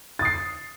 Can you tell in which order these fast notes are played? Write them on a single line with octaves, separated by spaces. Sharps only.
A6 D#6 C7